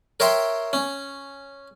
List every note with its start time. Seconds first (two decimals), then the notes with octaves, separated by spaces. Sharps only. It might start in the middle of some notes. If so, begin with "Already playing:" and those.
0.20 A#4 C#5 E5 G5 C6
0.73 C#4